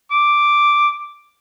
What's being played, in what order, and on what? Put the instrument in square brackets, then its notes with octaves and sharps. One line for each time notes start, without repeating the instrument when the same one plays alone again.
[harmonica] D6